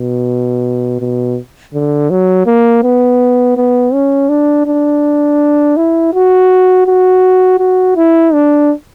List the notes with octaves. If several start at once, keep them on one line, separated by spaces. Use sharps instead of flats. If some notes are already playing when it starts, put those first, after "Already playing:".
Already playing: B2
B2
D3
F#3
A#3
B3
B3
C#4
D4
D4
E4
F#4
F#4
F#4
E4
D4